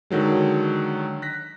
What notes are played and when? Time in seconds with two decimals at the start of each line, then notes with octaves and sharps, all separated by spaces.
0.10 D3 D#3 F#3 G#3
1.22 F#6 A#6 B6